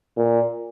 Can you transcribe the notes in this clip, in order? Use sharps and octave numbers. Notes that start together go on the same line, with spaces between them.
A#2